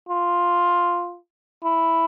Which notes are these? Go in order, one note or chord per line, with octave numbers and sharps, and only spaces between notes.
F4
E4